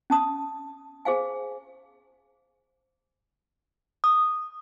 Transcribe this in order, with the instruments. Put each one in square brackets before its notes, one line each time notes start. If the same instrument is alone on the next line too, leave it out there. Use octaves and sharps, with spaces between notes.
[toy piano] C#4 A5 D#6
G#4 C5 F5 G#5
[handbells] D#6